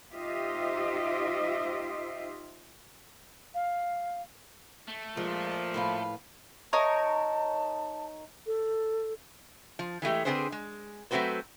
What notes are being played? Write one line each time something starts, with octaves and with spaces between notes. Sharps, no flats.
D#4 F4 G4 C5 D#5 E5
F5
A3
A#2 F3 G#3
A2 B4 F5
D#4 A#4 C#5 A5
A4
F3
E3 G#3 A3 G4
D3 C4 E4 G#4 B4 C5
G#3
F#3 A3 C4 F#4 B4 C5